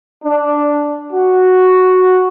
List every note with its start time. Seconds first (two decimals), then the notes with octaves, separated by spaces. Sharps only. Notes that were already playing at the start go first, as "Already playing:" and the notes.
0.24 D4
1.12 F#4